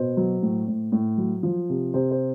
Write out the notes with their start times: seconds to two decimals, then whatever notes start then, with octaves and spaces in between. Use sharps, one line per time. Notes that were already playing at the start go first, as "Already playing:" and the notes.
Already playing: B2 C5
0.17 F#3
0.43 A2
0.67 A2
0.92 A2
1.18 F#3
1.43 F3
1.70 C3
1.94 C3 C5
2.11 C5